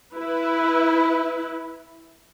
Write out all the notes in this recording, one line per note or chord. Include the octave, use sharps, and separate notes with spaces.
E4 B4